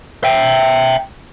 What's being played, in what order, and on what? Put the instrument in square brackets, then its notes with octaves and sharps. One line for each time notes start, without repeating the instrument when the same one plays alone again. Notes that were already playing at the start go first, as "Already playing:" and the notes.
[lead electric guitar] E5 G5